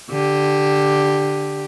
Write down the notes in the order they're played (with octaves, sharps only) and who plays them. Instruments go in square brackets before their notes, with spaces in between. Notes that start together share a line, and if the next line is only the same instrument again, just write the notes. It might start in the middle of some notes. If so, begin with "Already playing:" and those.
[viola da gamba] D3 G4